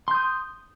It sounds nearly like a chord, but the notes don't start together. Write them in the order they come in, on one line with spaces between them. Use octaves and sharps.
C6 G6 D#6